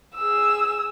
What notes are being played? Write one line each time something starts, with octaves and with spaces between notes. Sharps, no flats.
G#4 E6